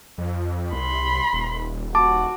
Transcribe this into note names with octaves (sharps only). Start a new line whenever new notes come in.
F2
C2 B5 C6
D#1
F#4 A5 D6